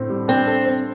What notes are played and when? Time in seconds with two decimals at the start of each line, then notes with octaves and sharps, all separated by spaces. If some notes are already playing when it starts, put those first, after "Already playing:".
Already playing: A2 D3 C4
0.10 G3
0.28 C4 D4
0.47 A4
0.66 C5